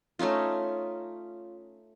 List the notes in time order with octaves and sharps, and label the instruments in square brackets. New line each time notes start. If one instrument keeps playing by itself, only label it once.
[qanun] A3 C#4 D#4 F4